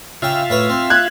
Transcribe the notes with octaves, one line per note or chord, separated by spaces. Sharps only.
C#3 F4 E5 F5 G5
A2 B4 C#5
C4
F#6 G#6